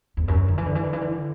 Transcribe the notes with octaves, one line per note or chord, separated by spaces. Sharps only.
E2
F#2
D3
E3
D3
E3
D3
E3
D3